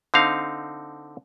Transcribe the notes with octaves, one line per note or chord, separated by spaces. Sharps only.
D3 C4 D#4 F5